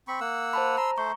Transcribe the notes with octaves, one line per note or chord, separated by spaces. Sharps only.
C4 B5 C#6
A#3 F#5 E6
C5 A5 B5
A#5 C6 E6
A3 C5 C#6